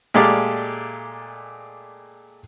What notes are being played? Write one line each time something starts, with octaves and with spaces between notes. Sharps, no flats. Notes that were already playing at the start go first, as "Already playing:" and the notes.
A#2 G#3 A3 G4 D5 F5